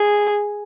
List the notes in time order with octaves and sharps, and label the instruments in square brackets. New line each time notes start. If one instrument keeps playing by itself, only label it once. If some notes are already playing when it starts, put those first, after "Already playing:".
Already playing: [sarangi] G#4